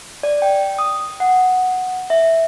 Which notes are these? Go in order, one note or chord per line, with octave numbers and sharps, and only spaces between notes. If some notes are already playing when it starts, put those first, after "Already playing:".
D5
G5
D#6
F#5
E5